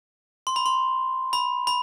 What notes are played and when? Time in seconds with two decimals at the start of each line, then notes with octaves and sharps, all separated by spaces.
0.47 C6
0.56 B5
0.66 C6
1.33 B5
1.67 B5